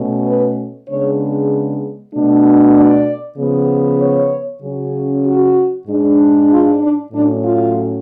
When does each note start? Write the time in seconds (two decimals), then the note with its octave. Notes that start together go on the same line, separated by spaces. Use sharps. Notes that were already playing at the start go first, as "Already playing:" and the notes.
Already playing: B2 A3 C#4
0.26 B4
0.88 C#3 G#3 B3 D4 C#5
2.14 B2 A3 D4
2.76 D5
3.38 C#3 F3 B3
4.01 C#5
4.63 C#3 F#3 C#4
5.25 F#4
5.88 G#2 G#3 D4
6.50 F4
6.82 D4
7.13 A2 F#3 C#4 D4
7.44 F4